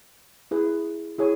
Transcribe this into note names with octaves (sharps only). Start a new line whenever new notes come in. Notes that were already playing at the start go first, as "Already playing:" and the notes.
E4 G#4 B4
E4 G#4 C#5 G#5